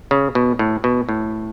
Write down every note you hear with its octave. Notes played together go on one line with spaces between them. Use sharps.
C#3
B2
A2
B2
A2